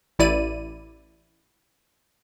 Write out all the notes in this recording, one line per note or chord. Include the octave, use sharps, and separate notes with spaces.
A1 E4 D5 D#7